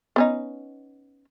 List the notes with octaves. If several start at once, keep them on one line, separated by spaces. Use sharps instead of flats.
B3 C#4 D#4